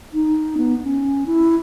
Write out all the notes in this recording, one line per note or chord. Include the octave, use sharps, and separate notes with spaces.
D#4
B3
C#4
E4